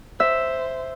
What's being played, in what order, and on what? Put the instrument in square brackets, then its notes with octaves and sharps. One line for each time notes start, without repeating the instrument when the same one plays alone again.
[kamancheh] C5 [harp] E5